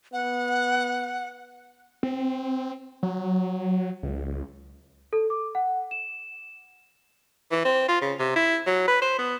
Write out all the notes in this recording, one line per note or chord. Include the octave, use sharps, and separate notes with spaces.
B3 F#5
C4
F#3
C#2
A4
D6
F#5
E7
E3
C4
F4
C#3
C3
E4
F#3
B4
C5
B3